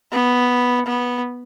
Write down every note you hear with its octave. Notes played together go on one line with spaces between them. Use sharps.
B3
B3